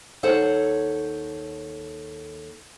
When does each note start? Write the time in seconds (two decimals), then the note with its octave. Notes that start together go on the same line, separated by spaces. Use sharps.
0.23 D#2 A4 C5 C#5 F#5